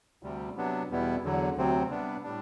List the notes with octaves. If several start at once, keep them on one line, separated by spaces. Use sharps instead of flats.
D2 C3 G3
C3 F#3 B3 D4
E2 B2 G3 B3 E4
E2 D3 F#3
D2 C3 F#3 C4
C3 G3 B3 D4
A2 G3 D4